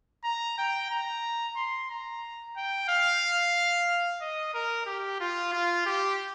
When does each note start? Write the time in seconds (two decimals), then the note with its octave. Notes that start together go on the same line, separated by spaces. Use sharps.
0.24 A#5
0.59 G5
0.90 A#5
1.56 C6
1.90 A#5
2.56 G5
2.89 F5
4.22 D#5
4.54 A#4
4.86 G4
5.21 F4
5.52 F4
5.86 G4